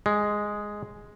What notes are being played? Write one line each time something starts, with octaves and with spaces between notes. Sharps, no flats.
G#3